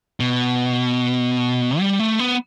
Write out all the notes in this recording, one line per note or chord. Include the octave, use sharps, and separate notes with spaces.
B2
G3
A3
B3